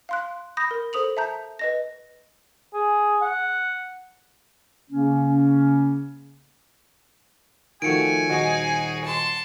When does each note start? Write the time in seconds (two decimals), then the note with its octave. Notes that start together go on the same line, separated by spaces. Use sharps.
0.09 F5 C6 F#6
0.57 B5 D#6 G6 A#6
0.71 A#4
0.93 A4 C5 D#6 F7 F#7
1.17 E5 A5 A#5 G6
1.59 B4 D#5 A#6
2.74 G#4
3.22 F#5
4.91 C#3 A#3 C#4
7.82 D#3 F3 A3 F#4 G#5 C#7 D7
8.29 D#1 D#4 F#4 G#4 D#5
9.04 A5 C6